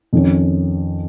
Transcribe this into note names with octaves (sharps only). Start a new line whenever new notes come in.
F2 D#3 C#4